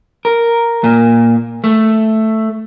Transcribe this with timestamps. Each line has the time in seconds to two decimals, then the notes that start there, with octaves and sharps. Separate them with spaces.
0.25 A#4
0.84 A#2
1.64 A3